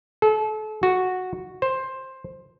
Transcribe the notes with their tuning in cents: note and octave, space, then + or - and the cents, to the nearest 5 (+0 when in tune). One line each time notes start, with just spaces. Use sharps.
A4 -35
F#4 -5
C5 +10